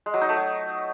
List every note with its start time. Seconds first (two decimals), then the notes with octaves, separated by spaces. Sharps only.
0.06 G#3
0.14 F#3
0.21 D#4
0.29 A3
0.37 F#3